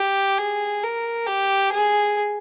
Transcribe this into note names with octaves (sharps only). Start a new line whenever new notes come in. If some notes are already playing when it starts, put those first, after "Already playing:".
Already playing: G4
G#4
A#4
G4
G#4